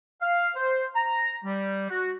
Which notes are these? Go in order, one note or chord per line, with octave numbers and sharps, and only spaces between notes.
F5
C5
A#5
G3
F#4